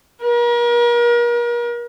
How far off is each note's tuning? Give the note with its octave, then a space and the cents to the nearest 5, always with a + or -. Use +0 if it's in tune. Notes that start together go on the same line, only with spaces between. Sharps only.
A#4 +40